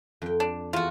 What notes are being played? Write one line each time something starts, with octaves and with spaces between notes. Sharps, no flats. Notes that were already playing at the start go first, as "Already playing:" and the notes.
F2 G5
D4
E2 F4 F#4 A5